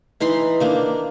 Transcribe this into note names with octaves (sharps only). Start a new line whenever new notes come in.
E3 D#4 B5 C6
D#3 A#3 D4